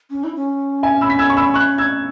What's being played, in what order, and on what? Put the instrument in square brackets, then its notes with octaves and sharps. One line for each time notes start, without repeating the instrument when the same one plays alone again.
[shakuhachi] C#4
E4
C#4
[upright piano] E5 G#5
B5 E6
B6
E6 G#6
C#6
B5 E6
C#6 F#6
E6 G#6